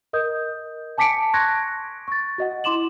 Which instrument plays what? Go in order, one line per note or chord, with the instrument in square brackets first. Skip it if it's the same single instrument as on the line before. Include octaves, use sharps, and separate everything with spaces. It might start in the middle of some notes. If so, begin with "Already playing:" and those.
[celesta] A#4 D#5 D#6 G6
G#5 A5 D6 B6 C#7 D7
C6 C#6 F#6 G#6 A#6
C#6 A6
F#4 D#5 F#5
E4 C6 D6 E7 F#7